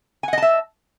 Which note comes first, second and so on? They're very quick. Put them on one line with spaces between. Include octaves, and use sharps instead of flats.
G#5 F#5 D#5 A5 E5